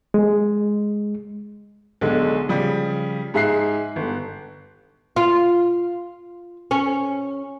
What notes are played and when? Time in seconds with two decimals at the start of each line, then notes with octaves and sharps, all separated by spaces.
0.14 G#3
2.01 B1 D3 G#3
2.49 C#3 F3 G3
3.34 G#2 G#4 E5 F#6 C7
3.96 G1
5.16 F4
6.71 C#4